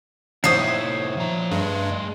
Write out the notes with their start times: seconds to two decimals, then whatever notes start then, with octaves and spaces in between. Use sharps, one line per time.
0.44 A#2 D#4 E4 C5 C#5 E5 D#6 C7
1.17 F3 A#5
1.51 G2 A3 G#4